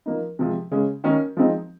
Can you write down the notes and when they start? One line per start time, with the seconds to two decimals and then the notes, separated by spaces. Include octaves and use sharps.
0.06 F3 A#3 D#4
0.39 C3 F3 G#3
0.71 C#3 G#3 C#4
1.04 D#3 A#3 C#4
1.37 F3 G#3 C4 D#4